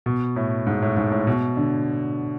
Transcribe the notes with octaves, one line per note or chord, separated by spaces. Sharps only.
B2
A2
G#2
A2
G#2
A2
B2
D3